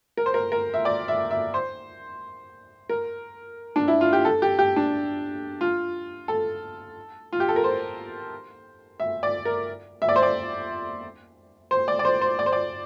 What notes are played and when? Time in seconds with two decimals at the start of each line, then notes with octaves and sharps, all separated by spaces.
0.17 A#4
0.26 C5
0.34 A#4
0.52 A#4
0.74 E5
0.85 D5
1.08 E5
1.31 E5
1.54 C5
2.89 A#4
3.76 D4
3.88 E4
4.01 F4
4.13 G4
4.25 A4
4.42 G4
4.59 G4
4.76 D4
5.61 F4
6.28 A4
7.33 F4
7.40 G4
7.49 A4
7.56 A#4
7.64 C5
9.00 E5
9.23 D5
9.45 A#4
10.02 E5
10.09 D5
10.16 C5
10.23 D5
11.71 C5
11.88 D5
11.99 D5
12.05 C5
12.21 C5
12.39 D5
12.46 C5
12.53 D5